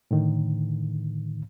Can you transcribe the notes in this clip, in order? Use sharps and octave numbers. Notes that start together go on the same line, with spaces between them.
A2 D3 D#3